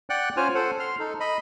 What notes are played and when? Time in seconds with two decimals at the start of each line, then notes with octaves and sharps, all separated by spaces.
0.10 D5 F#5 G5 F#6
0.37 C#4 F4 C5 G#5 F6
0.55 A4 C5 F#5
0.80 C6 F6
0.99 D#4 A4
1.20 D#5 B5